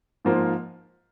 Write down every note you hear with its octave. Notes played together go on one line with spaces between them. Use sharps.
G#2 F3 A#3 F4